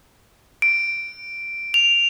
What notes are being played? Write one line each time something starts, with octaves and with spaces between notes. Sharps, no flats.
D7
F7